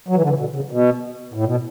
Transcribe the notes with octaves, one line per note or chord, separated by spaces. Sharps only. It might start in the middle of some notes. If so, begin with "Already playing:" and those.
F#3
E3
D3
C#3 E3
B2 D3
C#3
B2
A2
B2